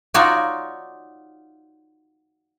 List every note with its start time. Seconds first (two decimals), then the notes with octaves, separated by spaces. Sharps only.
0.14 D#4 F4 F#4 C#5 D5